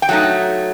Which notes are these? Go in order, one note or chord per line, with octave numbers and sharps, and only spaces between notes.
G5
F#3 A3 D#4 F#5